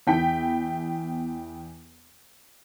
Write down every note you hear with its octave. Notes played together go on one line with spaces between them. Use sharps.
E2 B3 E4 G5 B6